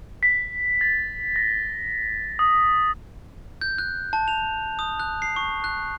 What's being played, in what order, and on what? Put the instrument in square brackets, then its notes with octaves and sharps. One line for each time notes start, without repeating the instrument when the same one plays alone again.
[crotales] B6
A6
A#6
D#6
[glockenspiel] G6
F#6
A5
F7
D#6
F#6
C7
C#6
F#6